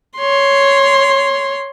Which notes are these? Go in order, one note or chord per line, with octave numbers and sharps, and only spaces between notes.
C#5 C6